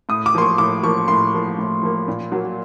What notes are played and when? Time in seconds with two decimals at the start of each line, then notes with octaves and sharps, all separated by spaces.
0.09 A2 D#6
0.26 D6
0.35 F3 A#3 C6
0.42 C#6
0.58 A2 D6
0.83 F3 A#3 C#6
1.08 A2 C6
1.33 F3 A#3
1.58 A2
1.83 F3 A#3
2.08 A#2
2.32 F#3 A#3